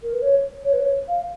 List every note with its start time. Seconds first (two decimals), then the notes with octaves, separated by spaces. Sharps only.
0.03 A#4
0.13 B4
0.22 C#5
0.64 C#5
0.73 B4
0.81 C#5
1.08 F5